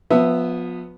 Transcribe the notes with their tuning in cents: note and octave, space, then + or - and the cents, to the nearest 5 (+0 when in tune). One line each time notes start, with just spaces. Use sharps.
F3 +30 B3 +0 E5 +0